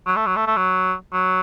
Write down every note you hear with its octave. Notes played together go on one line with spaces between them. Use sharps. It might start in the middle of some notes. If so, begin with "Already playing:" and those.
F#3
A3
F#3
A3
A3
F#3
F#3